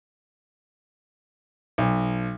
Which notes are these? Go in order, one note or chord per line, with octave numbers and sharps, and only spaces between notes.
B1